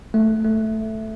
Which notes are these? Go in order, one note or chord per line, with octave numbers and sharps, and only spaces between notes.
A3
A3